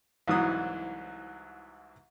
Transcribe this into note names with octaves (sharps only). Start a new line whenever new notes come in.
C2 G#2 E3 F#3 D#6